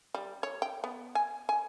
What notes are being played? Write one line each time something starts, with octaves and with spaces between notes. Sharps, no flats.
G3
C#5
G5
B3
G#5
G#5